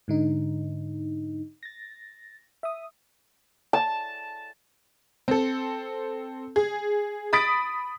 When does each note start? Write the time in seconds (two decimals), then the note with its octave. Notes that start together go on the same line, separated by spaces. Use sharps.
0.08 G#2 D3 D#4
1.63 A6 A#6
2.63 E5 D#6
3.73 A5
5.28 C4 A4
6.56 G#4
7.33 B5 D#6 A6 B6 D7